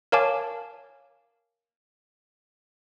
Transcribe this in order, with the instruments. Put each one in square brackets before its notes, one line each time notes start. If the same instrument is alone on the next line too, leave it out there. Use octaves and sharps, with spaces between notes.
[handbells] A#4 C#5 F5 G#5 A5 D6